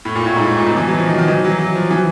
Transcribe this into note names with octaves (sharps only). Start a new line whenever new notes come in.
A2
A#2
A2
G#2
A2
A#2
B2
E3
F#3
F3
D#3
D#3
E3
F#3
F#3
F3
E3